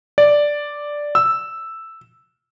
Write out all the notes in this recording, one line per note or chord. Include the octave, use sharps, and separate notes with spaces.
D5
E6